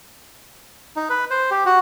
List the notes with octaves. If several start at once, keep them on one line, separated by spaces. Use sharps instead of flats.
D#4
B4
C5
G4
F#4